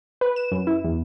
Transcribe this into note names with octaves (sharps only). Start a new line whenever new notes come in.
B4
E7
F#2
E4
E2